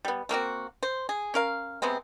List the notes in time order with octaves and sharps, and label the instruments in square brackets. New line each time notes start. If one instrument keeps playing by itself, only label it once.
[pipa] G3 B3
A3 A#3 C4 F#4
C5
G#4
C#4 A#4 F5
C3 G#3 B3 C4